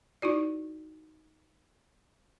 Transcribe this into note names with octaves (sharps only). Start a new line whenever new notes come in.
D#4 E4 F#4 D5